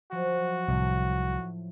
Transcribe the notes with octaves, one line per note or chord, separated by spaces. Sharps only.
F3 F#3 F#4
C2 A2